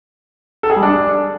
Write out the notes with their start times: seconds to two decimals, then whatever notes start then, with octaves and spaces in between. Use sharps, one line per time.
0.63 A4
0.70 G#4
0.76 G3
0.83 D4